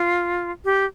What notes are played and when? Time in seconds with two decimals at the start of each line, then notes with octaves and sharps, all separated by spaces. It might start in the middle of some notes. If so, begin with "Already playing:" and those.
Already playing: F4
0.65 G4